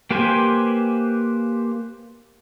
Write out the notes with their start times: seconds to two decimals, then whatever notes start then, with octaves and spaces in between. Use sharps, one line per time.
0.11 A#3 G4 B4 C5 G#5